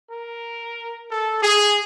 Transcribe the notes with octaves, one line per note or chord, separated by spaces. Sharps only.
A#4
A4
G#4